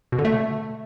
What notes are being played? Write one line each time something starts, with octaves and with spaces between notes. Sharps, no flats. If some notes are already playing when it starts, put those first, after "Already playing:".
B2
D3
A3